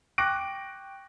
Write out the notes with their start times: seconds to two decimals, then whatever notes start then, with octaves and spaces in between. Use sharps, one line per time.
0.18 G5 C#6 D6 F#6 A#6 D7